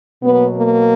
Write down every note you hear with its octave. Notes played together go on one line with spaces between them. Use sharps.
B2 F#3 A#3 B3
A#3